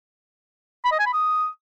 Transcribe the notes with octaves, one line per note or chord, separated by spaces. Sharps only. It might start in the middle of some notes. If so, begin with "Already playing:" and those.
B5
D#5
G#5
B5
D#6